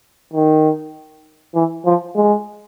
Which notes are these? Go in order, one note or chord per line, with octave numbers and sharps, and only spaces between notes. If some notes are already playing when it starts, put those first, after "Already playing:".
D#3
E3
F3
G#3